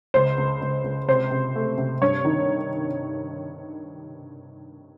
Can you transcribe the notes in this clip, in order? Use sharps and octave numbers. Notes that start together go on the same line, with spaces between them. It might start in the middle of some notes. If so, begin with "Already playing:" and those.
C#2 C5
C#2
C#2
C#2
C3 C5
C3
A3
C3
G2 C#5
D#3